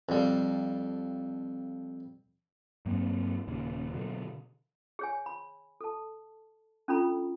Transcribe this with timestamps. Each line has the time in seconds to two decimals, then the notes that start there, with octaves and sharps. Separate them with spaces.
0.09 F2 G3
2.86 G2 F#3 A#3 C4
3.47 D#1 D#2 A#2 C#3
3.93 B2 D3 F#3
4.99 G#4 C#5 G#5
5.26 B5
5.81 A4 A5
6.88 C#4 D4 F4 A4 A#5 B5